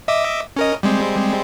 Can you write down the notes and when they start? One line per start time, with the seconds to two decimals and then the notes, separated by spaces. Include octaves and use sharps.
0.08 D#5 E5 D6
0.56 C#4 A#4 D#5
0.83 G3 G#3 C4